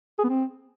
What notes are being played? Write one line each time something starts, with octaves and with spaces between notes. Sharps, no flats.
G#4
B3
C4